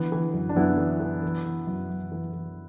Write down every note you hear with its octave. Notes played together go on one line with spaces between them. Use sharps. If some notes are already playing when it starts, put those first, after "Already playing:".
Already playing: D3 E3 B3
E3
F#2
D4
F#2 B3 E4
E3
E3
E3
E3
F#2
F#2
E3
E3